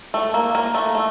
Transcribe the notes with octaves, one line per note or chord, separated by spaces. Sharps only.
A3
A#3
A#3
A3
A3